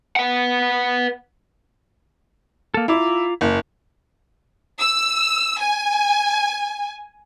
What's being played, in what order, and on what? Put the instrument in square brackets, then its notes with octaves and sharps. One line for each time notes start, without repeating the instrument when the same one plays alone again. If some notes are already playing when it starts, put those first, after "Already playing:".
[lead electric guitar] B4 F#5
[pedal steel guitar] A#3 A4
[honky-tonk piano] E4 [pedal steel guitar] F4 A#5 D6
[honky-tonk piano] F#1
[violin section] E6
G#5